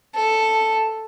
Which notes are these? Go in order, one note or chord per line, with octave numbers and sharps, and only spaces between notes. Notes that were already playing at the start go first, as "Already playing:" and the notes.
A4